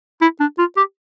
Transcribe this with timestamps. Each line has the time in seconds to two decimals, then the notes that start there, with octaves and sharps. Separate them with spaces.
0.21 E4
0.40 D4
0.58 F4
0.77 G4